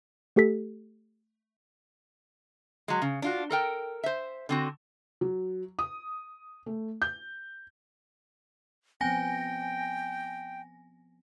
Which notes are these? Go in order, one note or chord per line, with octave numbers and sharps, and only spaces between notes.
A3 G4 A4 B6
F#3 G#3
C#3
D4 F4 F#4
A4 A#4 G5
C5 E5
D3 C4 F#4
F#3
D#6
A3
G6
F3 B3 C4 G5 G#5 A#6